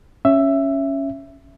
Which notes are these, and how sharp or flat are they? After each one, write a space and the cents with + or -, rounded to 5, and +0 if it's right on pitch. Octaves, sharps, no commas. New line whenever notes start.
C#4 +0 E5 +10